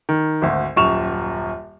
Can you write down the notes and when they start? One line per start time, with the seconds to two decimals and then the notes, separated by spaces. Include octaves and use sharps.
0.09 D#3
0.42 G#1 D2
0.76 D#1 F#2 C#6 E7 F7